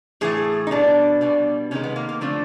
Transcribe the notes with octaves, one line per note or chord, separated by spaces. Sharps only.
A2 E3 A3 G#4
D#4
B2 G3 D4
B2 G3
C3 D#3 G#3 C#4
B3
A#3
A#3
D3 F3 A3 C4